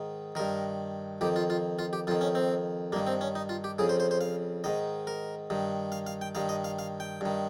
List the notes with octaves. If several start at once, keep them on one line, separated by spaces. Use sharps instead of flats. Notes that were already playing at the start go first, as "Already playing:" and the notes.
Already playing: G#2 D#3
G2 D#3 A#4
F2 D#3 G4
F4
F4
F4
G4
F2 D#3 F4
C#4
C4
G2 D#3 A#3
C4
C#4
D#4
F4
G4
F2 C#3 G#4
C5
C5
C5
F5
G#2 D#3 D#5
A#4
G2 D#3
F5
F5
G5
G2 D#3 F5
D#5
F5
F5
G5
G2 D#3